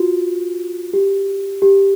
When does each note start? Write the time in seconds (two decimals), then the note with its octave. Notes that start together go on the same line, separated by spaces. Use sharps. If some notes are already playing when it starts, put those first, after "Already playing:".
Already playing: F4 F#4
0.93 G4
1.62 G4